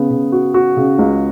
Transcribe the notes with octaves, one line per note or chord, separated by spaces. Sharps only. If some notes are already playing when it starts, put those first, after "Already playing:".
Already playing: C#3 B3
C#3
F#4
F#4
C#3
C#2